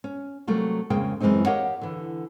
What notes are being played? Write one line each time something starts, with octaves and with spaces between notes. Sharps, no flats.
C#4
C3 F#3 G3 A3 A#3
F2 C#3 G#3 A#3 G5
F#2 E3 G#3 A3 C4 D#4
G4 A#4 C#5 D#5 F5 F#5
D3 E3